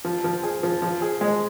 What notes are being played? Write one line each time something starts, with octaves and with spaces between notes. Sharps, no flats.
F3
F3
G#4
F3
F3
G#4
G#3